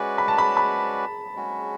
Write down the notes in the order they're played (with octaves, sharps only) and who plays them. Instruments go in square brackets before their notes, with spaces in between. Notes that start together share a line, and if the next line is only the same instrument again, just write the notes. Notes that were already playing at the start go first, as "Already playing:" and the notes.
Already playing: [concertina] G#3 C#4 F#4 B4 D5
[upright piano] B5
A5
B5
B5
[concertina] G#3 C#4 F#4